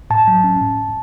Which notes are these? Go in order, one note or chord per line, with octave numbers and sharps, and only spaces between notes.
A2 A5
F#3
C#4
A2